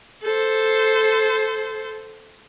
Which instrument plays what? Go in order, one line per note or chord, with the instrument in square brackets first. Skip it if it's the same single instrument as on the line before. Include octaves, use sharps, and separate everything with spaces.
[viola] A4 C5